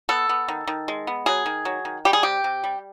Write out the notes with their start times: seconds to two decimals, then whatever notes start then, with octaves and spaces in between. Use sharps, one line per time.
0.09 B3 A4
0.29 B3
0.48 D#3
0.67 D#3
0.88 G#3
1.07 B3
1.26 F#3 G#4
1.46 D#3
1.65 F#3
1.85 D#3
2.05 G3 G4
2.13 G#4
2.23 C3 G4
2.44 C3
2.64 G3